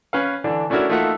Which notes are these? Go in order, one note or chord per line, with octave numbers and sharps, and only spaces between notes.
C#4 B4 F5
D3 E3 D4
A3 C#4 D4 E4 F#4 A#4
A3 A#3 D#4 F4 E5 F#5